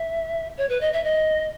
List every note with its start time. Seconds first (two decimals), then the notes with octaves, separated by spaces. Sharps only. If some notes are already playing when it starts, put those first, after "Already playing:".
Already playing: E5
0.57 C#5
0.69 B4
0.81 D#5
0.93 E5
1.04 D#5